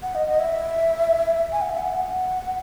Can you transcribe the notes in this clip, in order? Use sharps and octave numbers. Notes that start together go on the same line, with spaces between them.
F#5
D#5
D#5
E5
G#5
F#5
E5
F#5